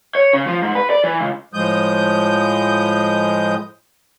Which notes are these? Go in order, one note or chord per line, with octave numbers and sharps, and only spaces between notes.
C#5
C#3
F3
G#2
B4
D5
E3
C#2
A2 F3 G#3 D#6 G6